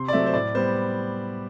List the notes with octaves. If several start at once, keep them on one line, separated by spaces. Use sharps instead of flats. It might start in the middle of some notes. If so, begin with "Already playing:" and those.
Already playing: C3 C6
D5
F#3 A3 C4 E5
C5
A2 D5
G3 B3 C5